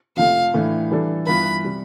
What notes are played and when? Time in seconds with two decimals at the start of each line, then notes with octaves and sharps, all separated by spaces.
0.16 F2 C3 F3 A3 F5
0.54 A2 E3 A3 D4
0.91 E3 G3 D4 A4
1.26 G2 E3 B3 F4 B4 B5
1.64 C3 G3